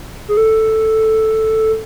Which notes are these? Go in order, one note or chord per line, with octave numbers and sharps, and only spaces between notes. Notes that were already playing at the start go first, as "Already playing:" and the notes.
G#4
A4